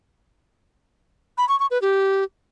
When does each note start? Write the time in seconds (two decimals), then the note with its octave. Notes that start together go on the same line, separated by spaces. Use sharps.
1.38 B5
1.49 C#6
1.60 C#6
1.71 B4
1.82 G4